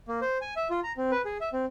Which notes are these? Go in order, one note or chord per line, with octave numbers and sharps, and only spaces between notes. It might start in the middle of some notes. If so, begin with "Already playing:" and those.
A#3
C5
G#5
E5
F4
A#5
C4
B4
G#4
E5
C4